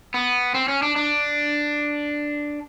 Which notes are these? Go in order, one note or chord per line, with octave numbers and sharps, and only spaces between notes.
B3
C4
C#4
D4
D4